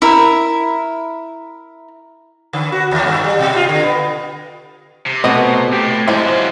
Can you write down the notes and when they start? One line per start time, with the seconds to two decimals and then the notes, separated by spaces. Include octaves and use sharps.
0.02 E4 A#4
2.53 D3
2.72 F#4
2.91 D#2
3.06 G2
3.24 G3
3.39 B2
3.56 F4
3.69 D3
3.83 B3
5.06 C3
5.24 B2 A3 C4 D#5
5.73 A2 G4
6.08 F#2 C3 F3 G#3 E4
6.24 F#3 F4